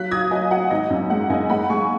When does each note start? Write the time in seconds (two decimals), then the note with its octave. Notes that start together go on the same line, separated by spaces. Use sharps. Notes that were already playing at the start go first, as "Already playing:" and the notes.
Already playing: F#3 F#6 B6
0.11 F#3 D#6 G#6
0.31 F#3 D#5 G#5
0.51 F#3 F#5
0.71 G#1 D#5
0.90 F#2
1.10 G#3 F#5
1.30 F#2 D#5 G#5
1.50 G#3 F#5 B5
1.70 G#3 G#5 C#6